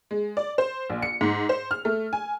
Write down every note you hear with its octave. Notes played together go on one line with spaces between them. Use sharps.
G#3
D5
C5
A#1
C#7
G#2
C5
F6
A3
G#5